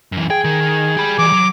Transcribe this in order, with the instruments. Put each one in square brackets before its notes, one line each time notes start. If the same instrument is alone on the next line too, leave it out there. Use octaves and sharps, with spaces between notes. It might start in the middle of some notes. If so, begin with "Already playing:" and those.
[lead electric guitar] F#2 E3
[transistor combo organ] G#4 [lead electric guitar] G5
[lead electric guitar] D#3
G4 B5
[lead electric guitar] E3 G3 [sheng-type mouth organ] D6
[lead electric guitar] F#3